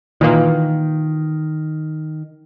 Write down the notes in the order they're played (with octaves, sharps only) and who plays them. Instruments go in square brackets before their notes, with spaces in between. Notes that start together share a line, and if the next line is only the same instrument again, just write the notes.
[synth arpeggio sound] A#2 E3 A#3 [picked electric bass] D#3